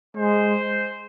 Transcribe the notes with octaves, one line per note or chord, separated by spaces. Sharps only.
G#3 C5